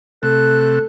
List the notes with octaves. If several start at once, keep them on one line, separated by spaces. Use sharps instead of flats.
C3 A3 A4 F#6